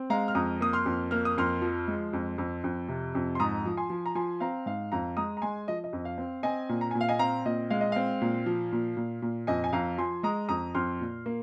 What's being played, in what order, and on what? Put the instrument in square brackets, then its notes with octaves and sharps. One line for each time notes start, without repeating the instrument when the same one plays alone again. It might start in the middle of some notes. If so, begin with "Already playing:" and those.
Already playing: [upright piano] C4
G#3 F5 A#5
F6
F2 A#5 D#6
A#3 D#6
C6 F6
F2
A#3 F6
D#6
F2 C6 F6
F3
G#3
F2
F2
F2
C3
F2
C6
G#2 A#5 D#6
F3
G#5 C6
F3
A#5
F3 G#5 C6
C4 F5 A#5
G#2 F5
F2 F5 A#5
G#3 A#5 D#6
A#5
G#3 G#5 C6
F3 D#5
D#5
F2
F5
C4
C4 D#5 G#5
A#2
A#5
A#2 G#5
F5
D#5 G#5
C4 F5 A#5
A#2 D#5
G#3 F5
D#5
C4 F5
A#2
F3
A#2
A#2
A#2
F2 D#5 G#5
G#5
F2 F5 A#5
F3 G#5 C6
G#3 A#5 D#6
F2 A#5 D#6
F2 C6 F6
A#2
A#3